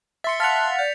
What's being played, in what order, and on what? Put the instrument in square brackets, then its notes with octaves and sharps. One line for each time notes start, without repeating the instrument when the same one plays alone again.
[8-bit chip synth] E5 C6 [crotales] A6 C#7
[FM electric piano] F5 F#5 [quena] A5 [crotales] A6 B6 F7
[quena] D5 [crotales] G6